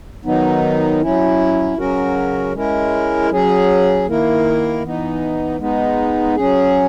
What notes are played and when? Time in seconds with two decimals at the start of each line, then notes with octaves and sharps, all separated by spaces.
0.25 D#3 F#3 B3 D#4
1.02 F#3 C#4 E4
1.77 C#3 F#3 C#4 F#4 A#4
2.53 G#3 C#4 E4 A#4
3.31 F#3 C#4 G#4
4.07 D#3 A#3 E4 A#4
4.82 E3 B3 D#4
5.58 G#3 B3 D#4
6.35 F#3 C#4 G#4